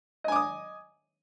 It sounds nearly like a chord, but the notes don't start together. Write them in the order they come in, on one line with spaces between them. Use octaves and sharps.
D#5 G#5 D6 D#6